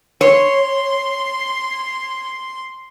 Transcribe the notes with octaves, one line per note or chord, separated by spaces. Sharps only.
C#5 C6